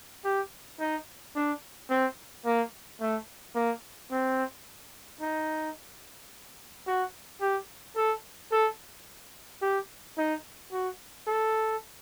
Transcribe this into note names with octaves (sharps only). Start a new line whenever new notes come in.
G4
D#4
D4
C4
A#3
A3
A#3
C4
D#4
F#4
G4
A4
A4
G4
D#4
F#4
A4